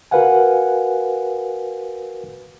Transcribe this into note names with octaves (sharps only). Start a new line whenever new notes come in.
F#4 A#4 B4 F5 F#5 G#5